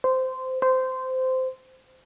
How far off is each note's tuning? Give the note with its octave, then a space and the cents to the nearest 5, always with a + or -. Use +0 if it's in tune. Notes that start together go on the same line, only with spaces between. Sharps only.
C5 -15
C5 -15